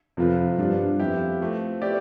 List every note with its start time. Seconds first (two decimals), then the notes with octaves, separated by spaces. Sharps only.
0.17 F2 C3 F3 C4 F4 B4
0.58 G2 F3 B3 D4 F4
1.00 F2 F3 B3 E4 G4
1.41 F3 A3 C4
1.82 B3 E4 G4 D5